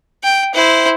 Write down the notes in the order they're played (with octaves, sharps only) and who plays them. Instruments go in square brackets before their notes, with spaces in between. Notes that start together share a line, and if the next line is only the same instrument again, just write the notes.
[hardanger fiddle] G5
E4 C5